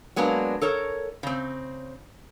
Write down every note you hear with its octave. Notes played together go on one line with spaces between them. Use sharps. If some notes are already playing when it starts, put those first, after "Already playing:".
F#3 G#3 A#3 B3 D4
A4 A#4 C#5
C#3 C4